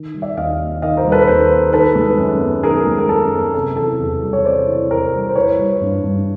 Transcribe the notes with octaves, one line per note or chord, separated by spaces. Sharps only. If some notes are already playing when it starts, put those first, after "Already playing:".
Already playing: D#3
G3
D5 E5
D#2 D#5 F5
A#3
D#3 D#5 F5
A#4 C5
G3
A4 B4
D#2 A#4 C5
A#3
D#3 A4 B4
G#3
F#2
B3
D#3 G#4 A#4
G#3
A#4
F#2 A4
B3
C3 A4
E3 A4
E2
G3
C#5
C3 C5 D5
E3
E2 A#4 C5
G3
C5
E3 B4 C#5
G3
G2
G2